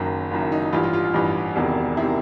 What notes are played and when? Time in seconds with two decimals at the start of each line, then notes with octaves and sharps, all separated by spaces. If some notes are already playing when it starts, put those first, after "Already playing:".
Already playing: F#1 F#2 D#3
0.31 F#1 F#2 D#3
0.42 E4
0.52 D#4
0.63 D#4
0.73 A1 G2 E3 F4
0.83 F4
0.93 F4
1.04 F4
1.14 A1 G2 E3
1.56 E1 E2 C3 D#3
1.97 C3 D#3 E4